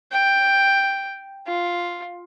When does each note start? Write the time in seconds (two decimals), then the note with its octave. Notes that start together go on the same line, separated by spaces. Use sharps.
0.12 G5
1.47 F4